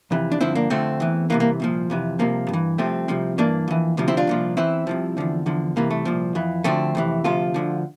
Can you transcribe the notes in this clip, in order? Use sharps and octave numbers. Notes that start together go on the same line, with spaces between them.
F2 C3 E3
D4
G2 D3 F3 C4 E4
A#3 D4
F2 D3 F3 A3 C4
E2 E3
C2 C3 E3 A#3
A#3
C2 A#2 F3
F2 C3 E3
C2 C3 F3 A#3
G2 E3
C2 C3 F3 A3 C4
C2 C3 F3
G2 E3 A#3 D4
F2 E3
D2 C3 F3
C4 E4
D4 F4
C2 A#2 F3
E2 E3 C4 E4
C2 C3 F3
E2 D3 F3
E2 D3 F3
C2 C3 E3 A#3
A3
C2 A#2 F3
F2 E3
D2 D3 F3 A3 C4
F2 C3 E3
D2 C3 F3 F4 A4
D2 D3 F3